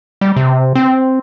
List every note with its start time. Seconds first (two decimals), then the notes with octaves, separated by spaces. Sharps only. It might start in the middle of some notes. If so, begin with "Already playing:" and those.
0.21 G3
0.36 C3
0.75 C4